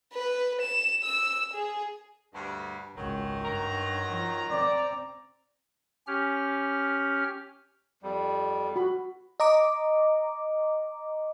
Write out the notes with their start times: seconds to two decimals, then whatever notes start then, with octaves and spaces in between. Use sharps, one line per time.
0.14 B4
0.62 E7
1.04 E6
1.54 G#4
2.33 D2 G2
2.95 G#1 C#2 F#2 D#3 F#3
3.45 G2 A#5
4.10 F3
4.51 C4 D5
6.07 C#4 G4 F6
8.03 F2 G3
8.76 F#4 B5
9.40 D#5 A#5 D6